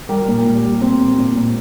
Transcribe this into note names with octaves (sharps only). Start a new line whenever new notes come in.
G3 G4 A#4
A#2
A#2
G3
C4
A#2
A#2
A#2